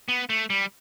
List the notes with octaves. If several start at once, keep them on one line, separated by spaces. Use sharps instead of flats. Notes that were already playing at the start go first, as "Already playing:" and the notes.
B3
A3
G3